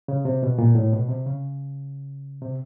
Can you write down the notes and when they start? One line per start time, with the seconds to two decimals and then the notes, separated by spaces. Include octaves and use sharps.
0.08 C#3
0.25 C3
0.43 B2
0.58 A#2
0.75 A2
0.93 B2
1.09 C3
1.26 C#3
2.42 C3